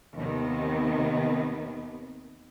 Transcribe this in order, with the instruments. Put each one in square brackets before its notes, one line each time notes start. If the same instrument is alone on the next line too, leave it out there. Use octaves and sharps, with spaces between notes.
[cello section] D#2 C3 D#3 B3